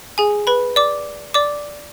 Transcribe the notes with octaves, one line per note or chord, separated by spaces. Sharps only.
G#4 G#5
B4 B5
D5 D6
D5 D6